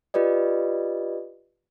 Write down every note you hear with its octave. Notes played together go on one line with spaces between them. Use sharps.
F4 G4 B4 D5 D#5